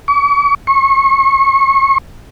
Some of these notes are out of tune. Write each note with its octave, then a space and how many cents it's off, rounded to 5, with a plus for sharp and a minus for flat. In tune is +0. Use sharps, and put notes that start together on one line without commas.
C#6 +45
C#6 -30